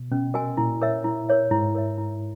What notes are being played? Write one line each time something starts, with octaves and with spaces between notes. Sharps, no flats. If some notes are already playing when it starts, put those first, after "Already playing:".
Already playing: B2
B2 C#4
F#4 A#4 D#5 G#5
A#2 E4
A#4 C#5 E5
E4
A#4 C#5 E5
G#2 E4
A#4 C#5 E5
E4